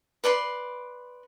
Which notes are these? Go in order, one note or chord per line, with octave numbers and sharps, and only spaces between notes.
B4 D5 B5 C6